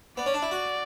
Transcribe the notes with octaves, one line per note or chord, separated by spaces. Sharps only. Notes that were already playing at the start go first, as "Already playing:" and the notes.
B3 D5
C#4
D4
E4
F#4